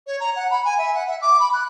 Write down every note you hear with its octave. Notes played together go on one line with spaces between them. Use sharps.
C#5
A#5
F#5
B5
G#5
E5
F#5
E5
D6
B5
F#6